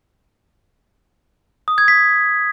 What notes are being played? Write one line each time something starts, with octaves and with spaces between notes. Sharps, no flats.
D#6
G#6
B6